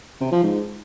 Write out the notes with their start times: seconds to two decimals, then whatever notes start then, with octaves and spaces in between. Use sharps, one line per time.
0.20 C3
0.32 F3
0.43 G#2